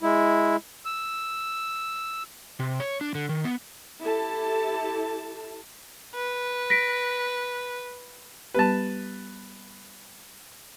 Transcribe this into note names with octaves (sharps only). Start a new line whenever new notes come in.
G#3 E4
E6
C3
C#5
D4
D3
D#3
B3
E4 G4 A4 A5
B4
A#6 B6 D7
G3 B3 G4 B4 A5